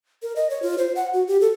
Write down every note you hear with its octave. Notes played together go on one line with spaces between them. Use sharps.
A#4
D#5
C#5
F4
C5
F#5
F#4
G4
A4